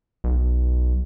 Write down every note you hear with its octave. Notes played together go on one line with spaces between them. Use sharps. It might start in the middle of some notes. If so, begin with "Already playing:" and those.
B1